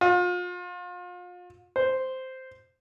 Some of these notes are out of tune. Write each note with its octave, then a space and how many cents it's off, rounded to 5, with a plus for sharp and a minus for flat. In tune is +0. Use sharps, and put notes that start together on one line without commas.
F4 +35
C5 -5